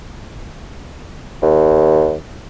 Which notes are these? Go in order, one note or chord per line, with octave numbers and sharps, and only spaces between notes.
D#2